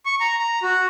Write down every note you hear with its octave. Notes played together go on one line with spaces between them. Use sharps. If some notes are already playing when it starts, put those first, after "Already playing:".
C#6
A#5
A#5
F#4